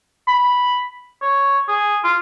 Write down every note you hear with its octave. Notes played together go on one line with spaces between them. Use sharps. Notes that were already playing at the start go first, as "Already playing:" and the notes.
B5
C#5
G#4
F4